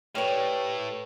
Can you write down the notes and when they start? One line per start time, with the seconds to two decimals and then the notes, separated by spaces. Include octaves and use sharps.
0.15 A2 G4 B4 C#5 D5 F6